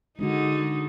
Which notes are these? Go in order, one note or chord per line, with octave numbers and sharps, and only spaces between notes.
D3 G#3 D4 D#4 F#4